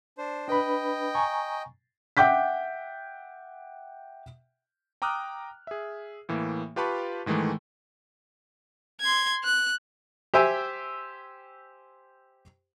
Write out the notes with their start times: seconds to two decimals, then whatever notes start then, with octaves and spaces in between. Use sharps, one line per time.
0.18 D4 C5
0.48 D4 B4 D#5 G5 B5
1.15 G#5 A#5 C#6
2.17 E5 F#5 G5 D6 G6 B6
5.02 G5 A#5 D6 D#6 F6 F#6
5.67 G#4 E5
6.29 A2 E3 A#3
6.76 F4 G4 B4 A5 B5 C#6
7.26 G#2 D#3 E3 G#3 A3
9.01 C6 G#6
9.44 F#6
10.34 G4 C5 E5 G5 G#5